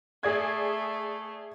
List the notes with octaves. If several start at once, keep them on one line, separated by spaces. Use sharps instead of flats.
A3 G#4 D5 G#6